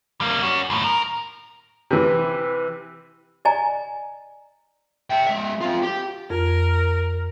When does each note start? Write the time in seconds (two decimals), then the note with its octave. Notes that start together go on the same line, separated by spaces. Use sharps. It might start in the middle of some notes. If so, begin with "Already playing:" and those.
0.21 G3 A#3
0.43 C#4 F#4
0.70 D#2 A2
0.84 A#4
1.91 C3 E3
3.45 D5 D#5 G#5 A#5
5.10 E5 G5
5.27 G#3 E5
5.61 C4 F4
5.83 G4
6.30 F2 A#4